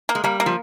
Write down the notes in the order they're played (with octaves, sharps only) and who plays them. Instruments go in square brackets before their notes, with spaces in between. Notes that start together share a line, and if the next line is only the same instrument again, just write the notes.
[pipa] A#3
[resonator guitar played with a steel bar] G#3
[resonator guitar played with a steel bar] G3 [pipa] A#3
[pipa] A#3
[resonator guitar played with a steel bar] F3